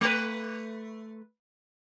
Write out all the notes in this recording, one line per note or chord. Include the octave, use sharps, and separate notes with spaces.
A3 B4